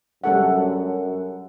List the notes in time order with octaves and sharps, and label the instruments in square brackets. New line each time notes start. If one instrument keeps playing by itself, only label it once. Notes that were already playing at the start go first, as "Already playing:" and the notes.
[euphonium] F#2 [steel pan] G3 A4 F#5